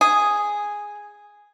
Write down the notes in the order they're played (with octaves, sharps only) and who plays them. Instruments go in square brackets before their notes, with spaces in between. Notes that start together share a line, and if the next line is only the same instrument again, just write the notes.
[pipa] G#4